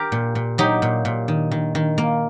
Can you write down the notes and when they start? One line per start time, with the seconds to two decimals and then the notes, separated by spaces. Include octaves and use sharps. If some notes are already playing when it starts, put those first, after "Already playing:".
Already playing: G4 A#4
0.12 A#2
0.35 A#2
0.58 F#3 D#4 G4
0.82 A#2
1.05 A#2
1.28 D#3
1.51 D#3
1.75 D#3
1.98 A#3